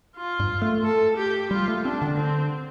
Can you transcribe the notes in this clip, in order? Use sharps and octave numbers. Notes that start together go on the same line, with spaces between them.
F4
G2
A3
A4
G4
G3 F4
A3
C4 D4
D3
C4